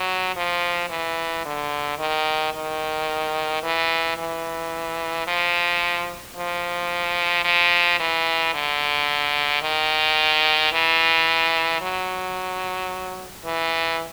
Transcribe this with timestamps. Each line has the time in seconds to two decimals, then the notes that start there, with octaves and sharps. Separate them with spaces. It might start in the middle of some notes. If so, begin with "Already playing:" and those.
Already playing: F#3
0.36 F3
0.90 E3
1.46 D3
1.99 D#3
2.54 D#3
3.63 E3
4.18 E3
5.27 F3
6.36 F3
7.44 F3
8.00 E3
8.54 D3
9.62 D#3
10.73 E3
11.81 F#3
13.45 E3